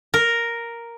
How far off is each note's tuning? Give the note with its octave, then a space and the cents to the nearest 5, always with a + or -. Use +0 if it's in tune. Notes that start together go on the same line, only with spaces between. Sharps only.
A#4 +0